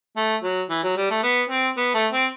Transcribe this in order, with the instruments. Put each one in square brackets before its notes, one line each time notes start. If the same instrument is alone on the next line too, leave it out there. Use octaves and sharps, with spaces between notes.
[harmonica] A3
F#3
E3
F#3
G3
A3
B3
C4
B3
A3
C4